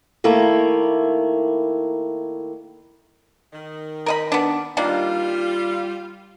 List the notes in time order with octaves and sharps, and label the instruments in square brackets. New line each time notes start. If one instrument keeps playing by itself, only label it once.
[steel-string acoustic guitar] D#3 A3 A#3 E4
[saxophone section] D#3
[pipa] A#4 D#5 B5
B3 D4
[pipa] D#3 A#3 D4 [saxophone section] G3 F4